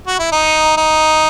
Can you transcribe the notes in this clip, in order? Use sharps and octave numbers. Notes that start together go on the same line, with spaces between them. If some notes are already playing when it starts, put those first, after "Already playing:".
F#4
E4
D#4
D#4